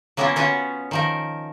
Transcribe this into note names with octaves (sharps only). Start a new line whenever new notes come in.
F#3 A#3 B3 C#4 E4 F4
B3 C#4 F4 F#4 B4 C#5
D#3 F3 A#4